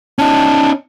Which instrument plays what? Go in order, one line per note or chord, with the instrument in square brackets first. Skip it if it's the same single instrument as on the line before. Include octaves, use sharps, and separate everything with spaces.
[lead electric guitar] C#4 D#4 [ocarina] A5